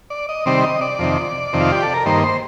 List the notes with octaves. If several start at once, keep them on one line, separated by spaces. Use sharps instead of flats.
D5
D#5
C3 D#3 G3 C4 D5
D#5
D5
F2 C3 D#3
F2 C3 D#3
F4
G4
A4
A#4
G2 D#3 A#3 C5
C5